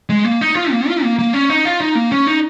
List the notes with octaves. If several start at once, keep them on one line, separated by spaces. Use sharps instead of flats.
G#3
A#3
D#4
F4
A#3
F4
A#3
A#3
C#4
D#4
F4
D#4
A#3
C#4
D#4